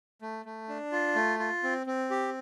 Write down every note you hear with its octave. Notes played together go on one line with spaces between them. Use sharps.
A3
A3
D4
F4
A3
F4
C4
C4
G4